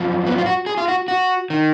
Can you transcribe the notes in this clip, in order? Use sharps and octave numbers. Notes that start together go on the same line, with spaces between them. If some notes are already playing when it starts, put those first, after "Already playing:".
Already playing: F#2 F3
B3
F4
F#4
G#4
F4
F#4
F#4
D#3